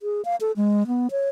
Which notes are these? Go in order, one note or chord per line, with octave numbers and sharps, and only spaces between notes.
G#4
F5
A4
G#3
B3
C#5